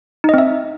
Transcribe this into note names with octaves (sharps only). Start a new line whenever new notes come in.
C4 D#4 D#5 E5